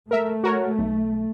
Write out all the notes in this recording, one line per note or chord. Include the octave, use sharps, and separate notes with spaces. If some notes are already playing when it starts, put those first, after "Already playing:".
A3 A#4 E5
F#4 A#4 C#5
B1